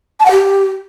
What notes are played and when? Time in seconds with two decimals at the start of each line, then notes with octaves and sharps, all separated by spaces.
0.20 A5
0.25 F#5
0.31 G4